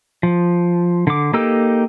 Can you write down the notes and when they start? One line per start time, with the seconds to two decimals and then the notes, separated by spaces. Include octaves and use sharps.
0.23 F3
1.07 D3 D6
1.34 A#3 D#4 G4 A4 E6